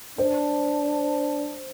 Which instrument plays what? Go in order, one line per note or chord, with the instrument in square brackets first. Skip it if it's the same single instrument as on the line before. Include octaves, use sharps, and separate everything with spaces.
[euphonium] D4 [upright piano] C5